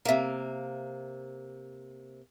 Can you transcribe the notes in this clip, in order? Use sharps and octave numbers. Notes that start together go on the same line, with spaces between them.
C3 A#3 E5 F5